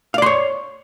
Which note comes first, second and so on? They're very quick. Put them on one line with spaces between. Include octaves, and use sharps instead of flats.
F5 D5 C6 C#5